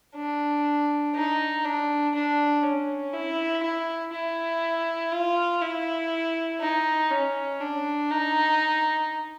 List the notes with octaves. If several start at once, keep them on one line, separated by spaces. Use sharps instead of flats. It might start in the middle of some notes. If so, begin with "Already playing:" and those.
D4
D#4
D4
D4
C#4
E4
E4
E4
F4
E4
D#4
C#4
D4
D#4